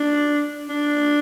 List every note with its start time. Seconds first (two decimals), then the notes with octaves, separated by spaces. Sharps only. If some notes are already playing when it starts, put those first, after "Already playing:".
Already playing: D4
0.69 D4